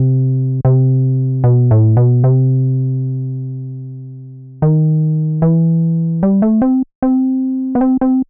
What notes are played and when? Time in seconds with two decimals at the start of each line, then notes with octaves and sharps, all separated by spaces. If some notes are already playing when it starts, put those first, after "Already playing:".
Already playing: C3
0.65 C3
1.44 B2
1.71 A2
1.97 B2
2.24 C3
4.62 D#3
5.42 E3
6.23 G3
6.42 A3
6.62 C4
7.02 C4
7.75 B3
7.81 C4
8.01 C4